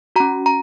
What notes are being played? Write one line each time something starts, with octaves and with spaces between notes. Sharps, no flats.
C#4 F#4 A#5
A#5